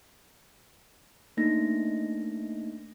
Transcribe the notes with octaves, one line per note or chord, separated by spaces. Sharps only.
A3 A#3 D4 D#4 A#6